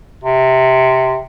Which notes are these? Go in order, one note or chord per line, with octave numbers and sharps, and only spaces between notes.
C3